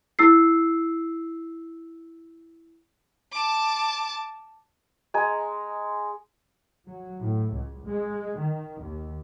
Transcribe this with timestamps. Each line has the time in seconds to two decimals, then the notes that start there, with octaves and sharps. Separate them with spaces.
0.19 E4 E6 C7
3.32 A5 D6
5.14 G#3 G#5 A#5
6.86 F#3
7.21 A2
7.54 C#2
7.86 G#3
8.38 D#3
8.82 D#2